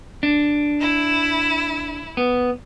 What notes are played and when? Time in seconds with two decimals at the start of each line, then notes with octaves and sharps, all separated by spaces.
0.23 D4
0.81 E4 E7
2.17 B3